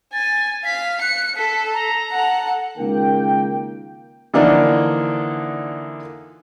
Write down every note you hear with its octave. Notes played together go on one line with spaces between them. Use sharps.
G#5 A6
F5 B6
F#6 C#7
A4 B6
A#5
A4 F#5
C#2 D#3 A#3 A#4 G5
D3 E3 F3 A#3 D4 D#4